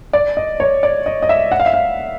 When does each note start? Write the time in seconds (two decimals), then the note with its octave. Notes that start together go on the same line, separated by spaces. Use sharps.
0.13 D5
0.37 D#5
0.60 C#5
0.83 D5
1.06 D#5
1.22 D#5
1.29 E5
1.52 F#5
1.60 F5
1.66 E5
1.74 F5